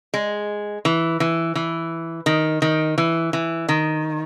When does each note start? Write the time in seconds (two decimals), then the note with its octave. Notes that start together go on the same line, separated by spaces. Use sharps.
0.14 G#3
0.85 E3
1.20 E3
1.55 E3
2.26 D#3
2.62 D#3
2.98 E3
3.33 E3
3.69 D#3